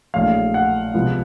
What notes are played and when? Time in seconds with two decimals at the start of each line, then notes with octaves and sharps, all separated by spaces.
0.14 A#1 A2 F#3 F5
0.54 F#5
0.94 C#2 C3 F3 G#3 B3